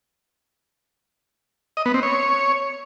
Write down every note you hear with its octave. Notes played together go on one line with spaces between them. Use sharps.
D#5
B3
C4
C#5